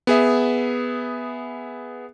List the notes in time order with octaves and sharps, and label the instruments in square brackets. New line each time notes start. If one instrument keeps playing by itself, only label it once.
[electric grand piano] B3 G#4 E5